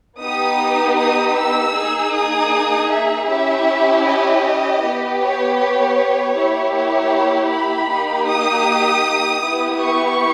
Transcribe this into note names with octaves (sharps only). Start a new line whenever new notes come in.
B3 D#4 G4 D#6
D#6
E6
A#3 D#4 G#4
D#6
E5
C#4 E4 G4 E5
D#5
B3 G4
C#5
C#5
A#3 E4 G4
C#5
B5
A#3 D#4 G4
D#6
B3 E4 G4
C#6